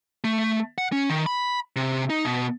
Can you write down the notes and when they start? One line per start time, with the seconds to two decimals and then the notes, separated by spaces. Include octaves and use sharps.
0.24 A3
0.78 F#5
0.92 C#4
1.10 D#3
1.26 B5
1.76 C3
2.10 D#4
2.25 B2